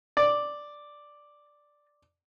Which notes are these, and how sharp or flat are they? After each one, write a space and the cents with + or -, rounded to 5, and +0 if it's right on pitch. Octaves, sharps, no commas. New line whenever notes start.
D5 +0